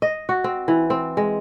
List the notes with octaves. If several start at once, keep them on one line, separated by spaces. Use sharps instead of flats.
D#5
F#4
C4
E3
C4
G#3